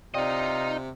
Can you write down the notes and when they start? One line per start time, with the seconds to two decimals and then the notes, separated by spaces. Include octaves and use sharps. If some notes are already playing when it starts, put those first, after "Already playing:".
0.14 C3 D#4 F4 D5 D#5 G5